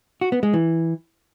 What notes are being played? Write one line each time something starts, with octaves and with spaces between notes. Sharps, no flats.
F#4
B3
G#3
E3